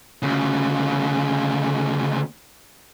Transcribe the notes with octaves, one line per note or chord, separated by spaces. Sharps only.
D2 C#3